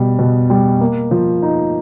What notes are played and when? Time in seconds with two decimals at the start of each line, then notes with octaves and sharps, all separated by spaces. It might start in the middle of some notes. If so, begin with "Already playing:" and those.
Already playing: B2 G3
0.19 B2
0.50 G3
0.80 A#3
1.11 F3
1.42 D#4